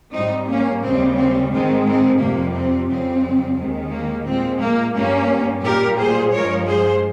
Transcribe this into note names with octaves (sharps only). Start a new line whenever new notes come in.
G#2 G3 C4 D#4
A#3 C#4
D#2 C#3 G3 C4
C4
G#2 D#3 G#3 C4
C4
F2 C3 G3 A#3
C4
F2 C#3 G3 C4
D#2 D#3 G#3
A#3
A#2 G#3 C4
A#3
G2 G3 A#3 C#4
A#2 G3 G4 A#4
G#4 C5
G2 F3 G#3 A#4 C#5
G#4 C5